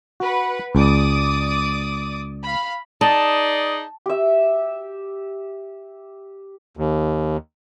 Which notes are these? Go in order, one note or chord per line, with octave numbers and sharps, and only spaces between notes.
F#4 B4 F#5
C#2 D5 D6 D#6
F5 B5
D#4 G#4 D5 A5
G4 E5
D#2